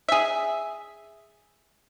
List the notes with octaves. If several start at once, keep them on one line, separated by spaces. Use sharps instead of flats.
G#4 E5